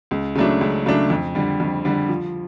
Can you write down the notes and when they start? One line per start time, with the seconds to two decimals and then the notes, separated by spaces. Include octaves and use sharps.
0.11 C#2
0.35 C#3 F#3 A3 D4
0.61 C#2
0.86 C#3 F#3 A3 D4
1.10 F2
1.35 D3 G3
1.60 F2
1.85 D3 G3
2.09 F3